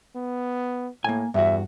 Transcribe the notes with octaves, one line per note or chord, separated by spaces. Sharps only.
B3
A2 A#3 G#5
E2 G2 F#4 E5